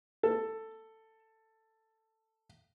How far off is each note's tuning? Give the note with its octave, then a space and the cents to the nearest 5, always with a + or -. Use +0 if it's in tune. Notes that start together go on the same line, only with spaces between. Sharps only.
A4 +10